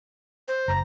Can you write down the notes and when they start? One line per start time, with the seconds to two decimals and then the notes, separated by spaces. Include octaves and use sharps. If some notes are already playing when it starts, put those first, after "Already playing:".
0.48 C5
0.68 F#1 A#5